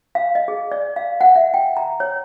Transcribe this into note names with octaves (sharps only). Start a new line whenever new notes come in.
F5
D#5
G#4
D5
F5
F#5
E5
G5
A#5
C#5